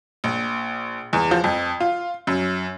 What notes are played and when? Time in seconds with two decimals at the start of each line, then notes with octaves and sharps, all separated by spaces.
0.24 A#1
1.13 E2
1.31 F3
1.44 F2
1.80 F4
2.27 F#2